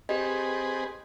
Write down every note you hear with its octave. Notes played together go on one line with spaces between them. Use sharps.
C4 G4 G#4 B4 D#5